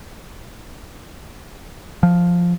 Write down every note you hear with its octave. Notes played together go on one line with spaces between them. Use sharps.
F3